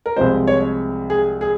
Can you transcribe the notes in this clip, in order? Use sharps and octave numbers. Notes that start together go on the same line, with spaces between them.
A#4
C2 C3 F3 G#3 C5
C#5
G#4
G#4